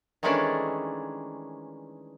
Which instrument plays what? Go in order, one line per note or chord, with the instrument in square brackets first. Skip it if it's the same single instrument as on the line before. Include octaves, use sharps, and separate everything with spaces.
[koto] D#3 E3 G#3 A3 C#4 D4